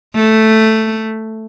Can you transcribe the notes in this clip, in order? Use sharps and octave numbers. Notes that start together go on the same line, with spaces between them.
A3